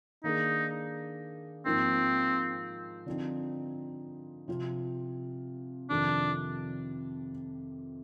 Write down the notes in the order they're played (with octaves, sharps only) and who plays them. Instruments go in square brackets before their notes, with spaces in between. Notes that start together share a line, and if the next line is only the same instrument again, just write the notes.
[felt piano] D#3 A#3 D4 G#4 [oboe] D#4
[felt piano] G#2 F3 A#3 D#4 A#4 [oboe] C4
[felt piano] D3 F3 C4 D#4
C3 F3 C4 F4
[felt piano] F2 C3 D#3 [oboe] D4